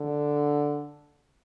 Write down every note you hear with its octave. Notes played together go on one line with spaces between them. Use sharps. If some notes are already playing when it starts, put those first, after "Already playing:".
Already playing: D3